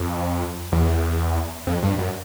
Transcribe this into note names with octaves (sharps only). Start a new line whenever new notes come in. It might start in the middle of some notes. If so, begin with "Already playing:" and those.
Already playing: F2
E2
F2
G2
F#2